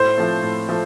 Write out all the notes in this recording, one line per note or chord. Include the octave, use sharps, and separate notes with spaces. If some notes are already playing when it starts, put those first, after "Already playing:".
Already playing: A2 C5
F3 A3 C4
A2
F3 A3